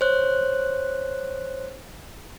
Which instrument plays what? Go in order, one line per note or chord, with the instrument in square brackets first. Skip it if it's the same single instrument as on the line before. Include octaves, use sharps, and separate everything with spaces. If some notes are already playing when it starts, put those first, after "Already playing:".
[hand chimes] C5 C#5 F#6